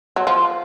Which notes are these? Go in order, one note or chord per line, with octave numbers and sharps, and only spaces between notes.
F#3
F3